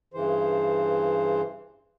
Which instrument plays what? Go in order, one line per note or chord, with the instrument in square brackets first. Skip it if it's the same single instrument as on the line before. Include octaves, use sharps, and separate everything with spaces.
[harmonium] G2 C#3 E3 C5